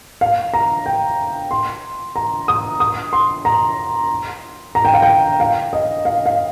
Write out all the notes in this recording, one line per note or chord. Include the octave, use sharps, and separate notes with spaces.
F5
A#5
G5
C6
A#5
D#6
D#6
C6
A#5
A#5
G5
F5
G5
F5
D#5
F5
F5